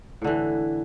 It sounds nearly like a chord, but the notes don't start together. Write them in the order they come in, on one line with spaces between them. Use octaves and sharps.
A2 D3 E3